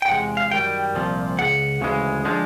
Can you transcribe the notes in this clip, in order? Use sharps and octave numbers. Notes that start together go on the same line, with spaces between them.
G5
E2 C3 G#3 F#5
F5
F#2 D#3 G3 G5
C2 A#2 F3
C#2 C#3 F#5
D2 C#3 E3 G#3
D3 F3 G#3